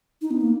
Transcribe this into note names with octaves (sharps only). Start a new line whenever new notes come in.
D#4
B3
A#3